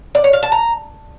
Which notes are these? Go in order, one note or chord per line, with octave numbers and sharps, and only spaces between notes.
D5
C#5
F5
A5
A#5